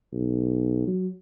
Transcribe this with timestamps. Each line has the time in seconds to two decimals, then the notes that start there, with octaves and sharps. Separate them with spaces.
0.12 B1
0.87 F#3